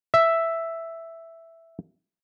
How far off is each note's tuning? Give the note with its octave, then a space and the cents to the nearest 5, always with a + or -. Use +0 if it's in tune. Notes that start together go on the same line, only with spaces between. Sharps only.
E5 +0